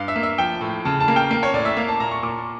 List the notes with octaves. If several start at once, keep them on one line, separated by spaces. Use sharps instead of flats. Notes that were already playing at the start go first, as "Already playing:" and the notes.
Already playing: G2 F5
E5
A#3
E5
F3 G5
A2
C#3 A5
A5
A#3
G5
A#3
C#5
A2 D5
E5
A#3 F5
A5
A#2 A#5
C#6
A#2 D6